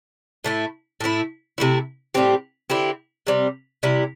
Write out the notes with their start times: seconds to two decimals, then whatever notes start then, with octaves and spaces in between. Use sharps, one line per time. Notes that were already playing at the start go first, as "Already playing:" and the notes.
0.44 A2 A3 E4
1.01 A2 A3 E4
1.58 C3 A3 E4
2.14 A2 G3 C4 G4
2.70 D3 C4 E4 G4
3.27 C3 G3 C4
3.83 C3 G3 E4